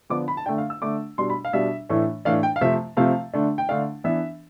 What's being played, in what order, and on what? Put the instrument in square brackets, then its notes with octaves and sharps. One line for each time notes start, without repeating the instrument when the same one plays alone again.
[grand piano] D3 F3 B3 D4 D6
B5
A5
D3 A3 D4 G5
F5
E6
D3 A3 D4 D6
B2 G3 D4 C6
B5
F5
B2 G3 D4 E5
A2 E3 A3 D4
A2 E3 A3 D4 F5
G5
F5
C3 F3 A3 C4 E5
C3 F3 A3 C4 F5
D3 A3 D4
G5
D3 A3 D4 F5
E3 B3 D4 E5